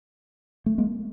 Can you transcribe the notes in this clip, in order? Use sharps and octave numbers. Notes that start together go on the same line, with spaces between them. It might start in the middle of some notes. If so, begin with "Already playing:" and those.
A3
G#3 A#3